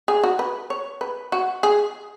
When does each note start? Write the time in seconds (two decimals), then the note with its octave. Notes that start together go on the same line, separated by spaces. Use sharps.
0.08 G#4
0.24 F#4
0.39 B4
0.70 C#5
1.01 B4
1.32 F#4
1.63 G#4